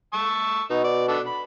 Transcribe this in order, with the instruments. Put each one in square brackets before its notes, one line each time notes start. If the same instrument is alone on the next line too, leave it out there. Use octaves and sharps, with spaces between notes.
[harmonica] A5 C#6 E6
[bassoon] B2 [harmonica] D#4
[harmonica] D5
B3 D4 A4
B5